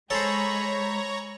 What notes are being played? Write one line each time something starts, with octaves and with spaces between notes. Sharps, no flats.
G#3 G#4 A4 C5 C#5 A#5 B5